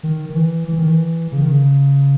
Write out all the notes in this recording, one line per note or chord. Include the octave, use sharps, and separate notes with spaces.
D#3
D#3
E3
E3
D#3
E3
C#3
D#3
C#3